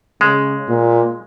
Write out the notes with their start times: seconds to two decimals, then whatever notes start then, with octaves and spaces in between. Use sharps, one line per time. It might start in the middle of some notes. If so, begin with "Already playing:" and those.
0.21 C#3 G#3
0.68 A#2